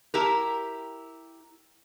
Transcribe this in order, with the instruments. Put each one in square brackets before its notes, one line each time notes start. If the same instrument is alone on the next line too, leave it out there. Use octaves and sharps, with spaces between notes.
[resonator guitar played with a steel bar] E4 G4 A#4